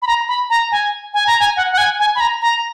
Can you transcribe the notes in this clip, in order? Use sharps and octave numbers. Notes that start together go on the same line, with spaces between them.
B5
A#5
B5
A#5
G#5
G#5
A#5
G#5
F#5
F#5
G#5
G#5
B5
A#5
A#5